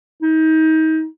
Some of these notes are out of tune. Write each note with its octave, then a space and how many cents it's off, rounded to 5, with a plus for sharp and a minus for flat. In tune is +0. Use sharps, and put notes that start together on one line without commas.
D#4 +30